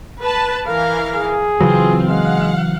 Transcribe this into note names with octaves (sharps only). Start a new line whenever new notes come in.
B4 A5
E3 A#4 F5
G#4
C#3 E3 F#3 C4 F4
G#3 F5 F#5